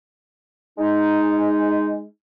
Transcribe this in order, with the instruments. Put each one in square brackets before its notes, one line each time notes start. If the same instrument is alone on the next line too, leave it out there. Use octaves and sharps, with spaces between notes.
[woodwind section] G#3 D#4